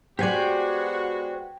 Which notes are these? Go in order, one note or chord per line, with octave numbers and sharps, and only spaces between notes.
G#3 B3 F#4 G4 C5 D5 G#5